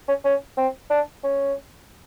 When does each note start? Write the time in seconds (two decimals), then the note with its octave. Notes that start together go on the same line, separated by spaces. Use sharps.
0.08 C#4
0.25 C#4
0.57 C4
0.90 D4
1.24 C#4